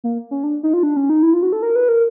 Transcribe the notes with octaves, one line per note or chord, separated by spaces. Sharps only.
A#3
C#4
D4
D#4
F4
D4
C#4
D#4
E4
F4
F#4
A4
A#4
B4
A#4